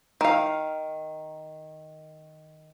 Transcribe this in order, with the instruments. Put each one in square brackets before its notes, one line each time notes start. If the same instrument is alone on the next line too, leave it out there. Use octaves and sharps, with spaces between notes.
[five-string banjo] D#3 F5